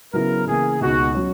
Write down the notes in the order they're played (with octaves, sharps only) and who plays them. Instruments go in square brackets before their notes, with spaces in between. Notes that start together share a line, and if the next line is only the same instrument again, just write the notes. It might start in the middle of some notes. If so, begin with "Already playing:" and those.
[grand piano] C#3 F#3 B3 E4 [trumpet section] A#4
[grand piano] C#3 E3 A#3 [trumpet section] G#4
[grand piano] C#2 B2 G#3 D#4 [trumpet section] F#4
[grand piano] F#3 C#4